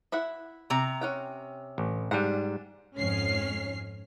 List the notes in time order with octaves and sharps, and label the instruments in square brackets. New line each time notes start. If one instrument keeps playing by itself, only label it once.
[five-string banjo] E4 E5 F#5
[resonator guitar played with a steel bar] C3 A#5
[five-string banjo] C#4 F#5 G5
[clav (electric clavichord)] A1
[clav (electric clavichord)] G#2 G3 [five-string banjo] D4 F#5
[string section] F2 G#2 C#4 C#5 F6 C7